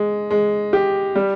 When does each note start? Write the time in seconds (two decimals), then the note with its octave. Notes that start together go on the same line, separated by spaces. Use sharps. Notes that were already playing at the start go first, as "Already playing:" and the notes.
Already playing: G#3
0.31 G#3
0.73 G4
1.15 G3